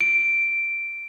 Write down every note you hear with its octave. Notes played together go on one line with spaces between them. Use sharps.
D7